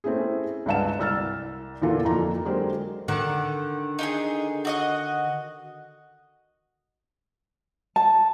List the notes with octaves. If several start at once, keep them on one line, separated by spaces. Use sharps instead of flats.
A3 C4 C#4 E4 G#4
C#2 G2 F5 F#5 A5 E7
C2 E6 F6 A6
E2 A#2 E3 F4 A4
F2 A#3 F4 A#5
D3 F#3 G#3 G4 A#4 C5
D3 D#3 F#5
D#4 G4 G#4
F#4 D#5 F#5
A5